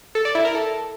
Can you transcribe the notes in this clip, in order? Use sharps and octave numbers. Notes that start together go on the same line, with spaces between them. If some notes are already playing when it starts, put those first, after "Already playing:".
A4
D5
E4
A#4
A4